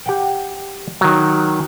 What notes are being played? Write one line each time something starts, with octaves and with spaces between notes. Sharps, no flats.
G4 F#5 G5
D#3 F#3